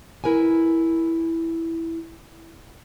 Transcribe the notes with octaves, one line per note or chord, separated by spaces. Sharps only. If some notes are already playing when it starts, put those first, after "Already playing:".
E4 A#4 B4 G#5